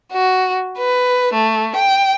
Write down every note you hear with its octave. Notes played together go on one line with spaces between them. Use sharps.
F#4
B4
A3
G5